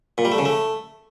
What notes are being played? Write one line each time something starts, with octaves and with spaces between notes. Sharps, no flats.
A#2
G3
A3
C#3
A3